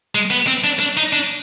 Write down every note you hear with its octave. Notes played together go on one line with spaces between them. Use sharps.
G#3
B3
C4
D4
D4
D#4
D4